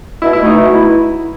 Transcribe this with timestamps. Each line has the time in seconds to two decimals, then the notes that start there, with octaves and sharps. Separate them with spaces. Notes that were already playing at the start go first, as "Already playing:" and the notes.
0.22 B2 E4
0.33 E4
0.38 A3
0.45 D#4
0.53 B2
0.69 E4